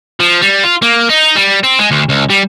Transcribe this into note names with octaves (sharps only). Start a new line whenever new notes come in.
F3
G3
F4
A#3
D#4
G3
C4
G#3
D2
C#2
G3